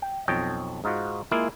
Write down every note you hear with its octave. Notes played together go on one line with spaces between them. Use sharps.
G5
B1 F2 C#5 D#5 G5 A5
G#2 D#4 F4 F#4
G#3 A#3 E4 F4 G#4 F5